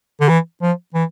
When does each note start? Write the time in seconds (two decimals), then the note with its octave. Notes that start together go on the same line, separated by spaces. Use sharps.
0.21 D3
0.29 E3
0.62 F3
0.94 E3